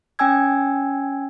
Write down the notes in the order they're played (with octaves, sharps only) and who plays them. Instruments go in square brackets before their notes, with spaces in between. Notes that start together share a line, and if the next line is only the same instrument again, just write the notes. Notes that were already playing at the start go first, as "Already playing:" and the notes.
[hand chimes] C#4 G5 G#5 E6 G#6